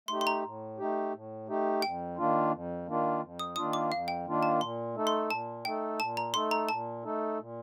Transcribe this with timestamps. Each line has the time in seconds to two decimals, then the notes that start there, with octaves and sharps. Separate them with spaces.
0.08 A3 D#4 G4 C6
0.21 C6
0.27 A#5
0.44 A2
0.78 A3 D#4 G4
1.13 A2
1.48 A3 D#4 G4
1.82 F2 G5
2.17 D#3 A#3 D4 F4
2.52 F2
2.87 D#3 A#3 D4 F4
3.21 F2
3.39 D#6
3.56 D#3 A#3 D4 F4 D#6
3.73 D6
3.91 F2 F5
4.08 G5
4.26 D#3 A#3 D4 F4
4.43 A5
4.61 A#2 C6
4.95 A3 D#4 A4
5.07 C6
5.30 A#2 A5
5.65 A3 D#4 A4 G5
5.99 A#2 A5
6.17 A#5
6.34 A3 D#4 A4 C6
6.51 A#5
6.69 A#2 A5
7.04 A3 D#4 A4
7.39 A#2